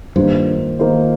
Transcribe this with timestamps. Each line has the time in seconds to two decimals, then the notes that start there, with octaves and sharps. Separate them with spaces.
0.16 G2 D#3 A#3 F4 C5
0.79 D#3 A#3 F4 C5